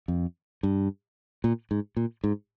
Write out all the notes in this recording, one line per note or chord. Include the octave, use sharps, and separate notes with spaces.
F2
G2
A#2
G#2
A#2
G#2